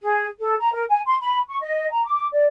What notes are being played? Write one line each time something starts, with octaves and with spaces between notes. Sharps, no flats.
G#4
A4
A#5
A#4
G#5
C6
B5
C#6
D#5
A#5
D6
D5